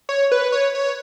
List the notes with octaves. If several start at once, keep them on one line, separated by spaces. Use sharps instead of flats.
C#5
B4
C#5
C#5